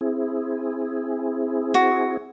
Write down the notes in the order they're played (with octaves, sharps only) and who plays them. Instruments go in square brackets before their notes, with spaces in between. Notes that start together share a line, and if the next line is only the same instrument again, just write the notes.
[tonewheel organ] C4 E4 G#4
[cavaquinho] F#4